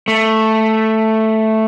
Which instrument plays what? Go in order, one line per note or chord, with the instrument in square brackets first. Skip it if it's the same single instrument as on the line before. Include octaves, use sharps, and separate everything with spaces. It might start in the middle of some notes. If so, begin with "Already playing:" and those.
[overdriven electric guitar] A3